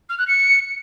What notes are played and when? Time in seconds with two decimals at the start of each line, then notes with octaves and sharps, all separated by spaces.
0.09 F6
0.18 F#6
0.27 C#7